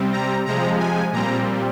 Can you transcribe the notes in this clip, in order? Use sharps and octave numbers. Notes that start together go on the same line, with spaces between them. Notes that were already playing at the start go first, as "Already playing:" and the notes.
Already playing: C3 G3 C4
A#5
C3 F3 G#3 A#5
G#5
A#2 G3 C4 A#5